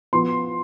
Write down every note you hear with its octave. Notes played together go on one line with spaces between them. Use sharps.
F3 B3 F4 C6